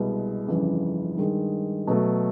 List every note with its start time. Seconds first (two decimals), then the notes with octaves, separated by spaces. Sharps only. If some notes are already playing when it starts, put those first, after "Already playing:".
Already playing: C2 B2 G#3 B3
0.48 G1 F2 C#3 E3
1.17 G2 D#3 G#3
1.87 B2 F#3 A3